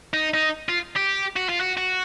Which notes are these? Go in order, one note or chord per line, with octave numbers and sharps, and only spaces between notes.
D#4
D#4
F4
G4
F#4
F4
F#4
F#4